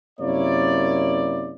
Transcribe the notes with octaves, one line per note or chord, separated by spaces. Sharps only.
F#2 C3 A#3 E4 C#5 D5